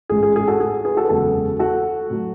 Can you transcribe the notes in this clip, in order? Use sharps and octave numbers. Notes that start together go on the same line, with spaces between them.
A1 G#2 G#3 G#4
G#4
G#4
F#4 A4
G#4
G#4 B4
F#4 A4
B4
F#1 E2 C#3 G#3 F#4 A4
F#4 A4
A2 F#3 A3